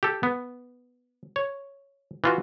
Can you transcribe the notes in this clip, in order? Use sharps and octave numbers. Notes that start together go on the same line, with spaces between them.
G4 A4
B3
C#5
E3 F4 F#4